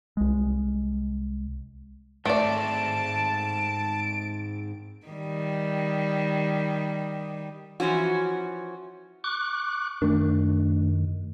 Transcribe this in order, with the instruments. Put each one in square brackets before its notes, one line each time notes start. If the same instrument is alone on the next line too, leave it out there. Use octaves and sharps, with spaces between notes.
[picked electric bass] C2 G#3
[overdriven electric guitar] G#2 C4 [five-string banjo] A3 D5 [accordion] A5 [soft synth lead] D7
[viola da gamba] D#3 G3
[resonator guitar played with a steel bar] E3 F3 C#4 F#4
[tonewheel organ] C#6 D6 F#6
[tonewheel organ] F#2 D#3 [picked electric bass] A3 D4